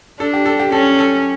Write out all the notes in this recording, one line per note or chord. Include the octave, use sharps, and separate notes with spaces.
D4 A4
G4
A4
G4
C#4 A4
A4